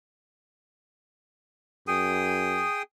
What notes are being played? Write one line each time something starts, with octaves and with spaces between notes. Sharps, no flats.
F#2 G#4 G5 D#6